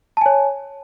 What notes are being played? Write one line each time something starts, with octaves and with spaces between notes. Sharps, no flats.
C#5 G#5 A5